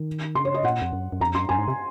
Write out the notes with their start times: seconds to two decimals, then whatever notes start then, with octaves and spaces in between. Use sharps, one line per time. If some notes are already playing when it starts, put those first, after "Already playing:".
Already playing: D#3
0.35 C#3 C6
0.45 C#5
0.54 D#5
0.63 A#2 F#5
0.82 F2
0.93 F#2
1.12 F#2
1.21 F2 A#5
1.35 F#2 C6
1.49 F#2 G#5
1.58 G#2
1.68 C3